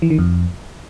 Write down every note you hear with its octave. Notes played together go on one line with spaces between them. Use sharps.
E3
D#3
F2